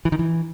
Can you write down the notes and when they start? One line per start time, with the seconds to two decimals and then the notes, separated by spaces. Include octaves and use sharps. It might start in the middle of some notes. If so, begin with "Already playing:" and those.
0.05 E3
0.12 D#3
0.19 E3